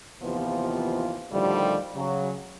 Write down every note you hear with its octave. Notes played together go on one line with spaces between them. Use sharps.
D#2 C3 E3 F3 B3 F4
A2 D3 D#3 F3 G3
C#3 F#3